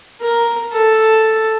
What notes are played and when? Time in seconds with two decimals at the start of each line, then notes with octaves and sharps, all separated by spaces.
0.21 A#4
0.73 A4